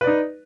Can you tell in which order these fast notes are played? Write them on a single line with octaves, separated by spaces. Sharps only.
B4 D5 D#4